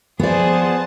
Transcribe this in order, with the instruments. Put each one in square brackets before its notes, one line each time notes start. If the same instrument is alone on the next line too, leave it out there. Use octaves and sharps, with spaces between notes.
[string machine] F3 A5 [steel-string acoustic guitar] B3 D5 [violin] G#4 C5